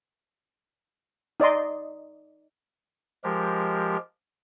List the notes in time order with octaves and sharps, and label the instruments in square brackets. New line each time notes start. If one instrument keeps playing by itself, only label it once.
[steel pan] D#4 D5 D#5 C6
[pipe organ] F3 G#3 G4 A#4